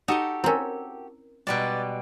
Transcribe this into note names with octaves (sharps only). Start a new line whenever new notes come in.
D#4 F#4 G4 A4 D#5
C4 C#4 E4 A#4
B2 G3 G#3 D5